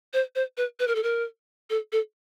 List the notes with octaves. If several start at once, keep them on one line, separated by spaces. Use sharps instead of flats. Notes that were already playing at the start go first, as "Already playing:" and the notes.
C5
C5
B4
B4
A#4
A4
A#4
A4
A4